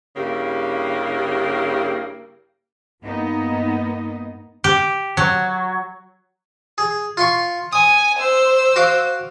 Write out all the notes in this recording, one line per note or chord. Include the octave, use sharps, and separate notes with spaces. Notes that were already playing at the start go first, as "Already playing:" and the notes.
G2 C#3 A#3 E4 G4
G2 A#3 B3 D#4 D#5
G4
F#3
G#4
F4 C6 C#6
G#5 D#6
C5 E6
F#4 F5 D6